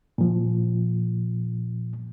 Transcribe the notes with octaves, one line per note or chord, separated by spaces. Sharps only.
A#2 F3